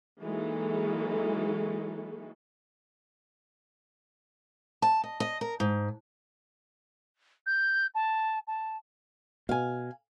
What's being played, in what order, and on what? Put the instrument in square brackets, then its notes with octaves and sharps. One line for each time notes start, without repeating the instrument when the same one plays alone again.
[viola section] E3 F#3 G#3 A#3 D#4 A4
[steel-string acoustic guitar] A5
D#5
D#5
A#4
G#2
[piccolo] G6
A5
A5
[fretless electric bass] B2 [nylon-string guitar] F5 G#5